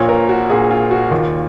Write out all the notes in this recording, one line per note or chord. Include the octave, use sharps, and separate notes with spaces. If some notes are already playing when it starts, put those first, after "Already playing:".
Already playing: A#1 A#2 C#5
A#4
F#4
A#1 A#2 G#4
F4
F#4
D#2 D#3 F4